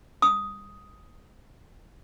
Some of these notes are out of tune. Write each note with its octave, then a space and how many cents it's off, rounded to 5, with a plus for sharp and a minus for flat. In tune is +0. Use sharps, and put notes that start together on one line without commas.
D#6 +5